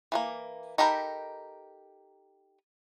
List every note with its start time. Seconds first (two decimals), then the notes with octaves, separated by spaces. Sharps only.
0.12 E3 G#3 A#3
0.78 D#4 G4 A4 A#4 B5